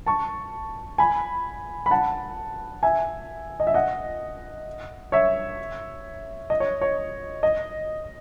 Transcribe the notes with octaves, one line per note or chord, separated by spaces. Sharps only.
A5 C#6
G#5 B5
B5
F#5 A5
E5 G#5
D#5
E5
D#5 F#5
C#5 E5
D#5
C#5
C#5
D#5